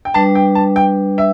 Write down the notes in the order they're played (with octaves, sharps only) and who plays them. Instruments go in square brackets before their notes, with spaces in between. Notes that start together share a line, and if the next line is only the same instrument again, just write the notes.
[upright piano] G5
[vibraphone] G3 D4 B4 [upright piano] A5
[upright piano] G5
A5
G5
E5